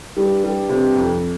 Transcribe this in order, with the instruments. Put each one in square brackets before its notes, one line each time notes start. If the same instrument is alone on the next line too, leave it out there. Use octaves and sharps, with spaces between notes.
[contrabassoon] G2 [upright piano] G3
[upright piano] G3
C3
F2